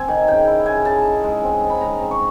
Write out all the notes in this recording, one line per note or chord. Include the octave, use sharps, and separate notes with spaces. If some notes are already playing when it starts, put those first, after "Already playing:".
Already playing: C4 G#5
D#3
C#3 G5
E4
C#3 G#5
C#3 A5
D#4
G#3
C4
D#4
B5
C#3 A#5
C4
C#6